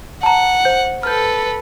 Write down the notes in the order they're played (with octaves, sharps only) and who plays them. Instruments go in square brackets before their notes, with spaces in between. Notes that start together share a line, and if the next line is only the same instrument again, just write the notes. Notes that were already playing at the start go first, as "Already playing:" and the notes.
[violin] F#5 [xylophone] A5 A#5
[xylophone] C5 G6
[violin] A4 B4 [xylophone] F6 G6